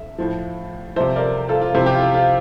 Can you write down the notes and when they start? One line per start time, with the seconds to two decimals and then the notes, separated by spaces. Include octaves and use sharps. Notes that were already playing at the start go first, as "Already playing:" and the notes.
Already playing: E5
0.18 A2 F3
0.96 C3 F3 C5 E5
1.16 A#4 D5
1.49 F4 A4
1.62 F4
1.75 C3 F3 E4
1.86 G4
1.94 F4
2.14 F4